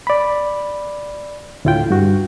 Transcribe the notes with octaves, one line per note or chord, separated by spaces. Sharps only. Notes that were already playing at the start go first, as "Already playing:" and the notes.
D5 B5
D2 A2 E4 F4 G5
G2 F#4